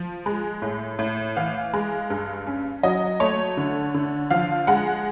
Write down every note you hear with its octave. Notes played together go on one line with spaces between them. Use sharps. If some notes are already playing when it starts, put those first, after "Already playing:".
Already playing: F3
G#3
A2
A2
E3 F5
G#3
G2
C#4
F#3 D#5
A3 C#5
D3
D3
F3 F5
G#3 F#5